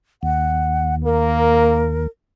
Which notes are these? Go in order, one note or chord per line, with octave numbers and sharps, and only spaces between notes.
D#2 F#5
A#3 A#4